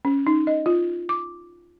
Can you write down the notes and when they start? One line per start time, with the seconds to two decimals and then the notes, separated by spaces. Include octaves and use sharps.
0.05 C#4
0.27 D#4
0.47 D#5
0.66 F4
1.09 D6